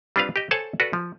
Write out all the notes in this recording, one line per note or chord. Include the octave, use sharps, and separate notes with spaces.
G3 C4 D4 F4 B4 F5
G4 D#5
A4 C5 C#5 F#5 G#5 A5
F#4 A4 B4 D5
F3